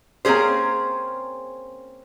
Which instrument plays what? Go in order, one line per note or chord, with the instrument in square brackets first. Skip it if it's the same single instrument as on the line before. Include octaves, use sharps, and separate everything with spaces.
[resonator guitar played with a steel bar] A#3 C4 C#4 G#4 C5